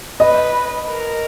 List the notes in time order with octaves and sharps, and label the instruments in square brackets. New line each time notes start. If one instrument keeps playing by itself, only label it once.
[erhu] B4 [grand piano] D#5
[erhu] A#4